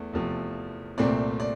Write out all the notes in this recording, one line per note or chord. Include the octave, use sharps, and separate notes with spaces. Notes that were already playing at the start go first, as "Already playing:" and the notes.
Already playing: E2 A3
E2 C3 F3 A3
C2 A#2 A3 C4 D5
D5